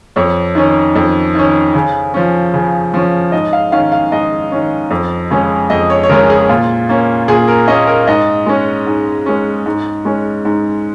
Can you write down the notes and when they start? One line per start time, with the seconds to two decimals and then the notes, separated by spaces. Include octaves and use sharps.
0.16 F2 C#5
0.55 D#3 C#4
0.95 F2
1.35 D#3 C#4
1.74 C#3
2.14 F3 C#4
2.54 C#3
2.94 F3 C#4
3.32 G#2 D#5
3.53 F5
3.72 D#3 C#4 F5
3.92 F5
4.12 G#2 D#5
4.52 D#3 C#4
4.91 F2
5.30 C#3 G#3 C#4
5.70 F2 D#5
5.90 C#5
6.03 C#5
6.09 C#3 G#3 C#4 A#4
6.30 G#4
6.49 A#2 F4
6.89 A#3 C#4
7.28 A#2 G#4
7.48 A#4
7.68 A#3 C#4 D#5
7.87 A#4
8.07 G#2 D#5
8.46 G#3 C#4
8.87 G#2
9.26 G#3 C#4
9.66 G#2
10.05 G#3 C#4
10.45 G#2